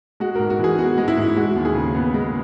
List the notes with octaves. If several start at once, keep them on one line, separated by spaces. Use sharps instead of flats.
G#3 F#4
G#2 A#4
F#4
E3 G#4
B3 F#4
G#3
E4
G#2
G#3 F#4
D#2
G#4
C#3
B3
G#3